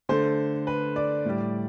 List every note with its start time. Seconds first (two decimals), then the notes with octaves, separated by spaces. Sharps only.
0.09 D3 A3 C5
0.67 B4
0.96 D5
1.25 A2 G3